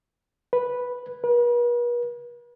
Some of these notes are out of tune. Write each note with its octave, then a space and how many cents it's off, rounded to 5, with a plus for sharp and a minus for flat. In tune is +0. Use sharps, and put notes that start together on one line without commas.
B4 -5
B4 -45